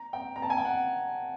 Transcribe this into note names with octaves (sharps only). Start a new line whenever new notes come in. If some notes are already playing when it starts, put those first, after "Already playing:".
Already playing: A#5
G5
A#5
A5
G#5
G5
F#5